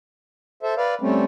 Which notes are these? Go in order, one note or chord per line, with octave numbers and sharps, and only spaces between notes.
A4 C5 E5
B4 D5 F5
G3 A3 C4 C#4